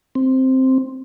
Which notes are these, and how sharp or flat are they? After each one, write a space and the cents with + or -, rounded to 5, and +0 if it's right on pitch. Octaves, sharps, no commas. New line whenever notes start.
C4 +0